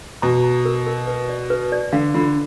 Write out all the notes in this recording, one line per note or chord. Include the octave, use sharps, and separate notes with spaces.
B2 A#5
A#5
A#4
A#4
B4
D5
B4
D5
D3 F5
D3 F4